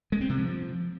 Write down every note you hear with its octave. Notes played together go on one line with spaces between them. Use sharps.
G#3
C4
C3
F3